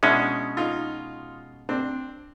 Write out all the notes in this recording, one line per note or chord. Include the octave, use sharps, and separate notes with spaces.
B2 G#3 C#4 D4 E4
D#4 F4
C4 D4